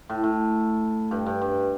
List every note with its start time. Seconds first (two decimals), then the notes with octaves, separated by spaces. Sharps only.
0.09 A2
0.24 A2
1.11 G2
1.26 G2
1.41 G2